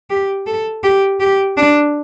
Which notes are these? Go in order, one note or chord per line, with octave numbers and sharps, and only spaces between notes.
G4
A4
G4
G4
D4